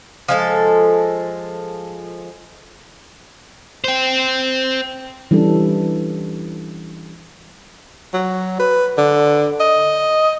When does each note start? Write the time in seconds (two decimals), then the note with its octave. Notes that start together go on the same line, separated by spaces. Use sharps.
0.28 F3 G#3 A4
3.84 C5 G5
5.31 E3 G3 C#4 D4 A4
8.13 F#3
8.59 B4
8.98 D3
9.60 D#5